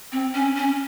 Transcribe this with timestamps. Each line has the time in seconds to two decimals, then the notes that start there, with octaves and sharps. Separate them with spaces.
0.12 C4
0.34 C#4
0.56 C#4